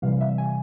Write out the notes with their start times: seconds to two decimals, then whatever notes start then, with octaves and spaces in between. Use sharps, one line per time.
0.02 C3 E3 G3 F5
0.21 E5
0.38 G#5